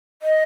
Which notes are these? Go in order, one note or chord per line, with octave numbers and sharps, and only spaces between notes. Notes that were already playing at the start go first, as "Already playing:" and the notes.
D#5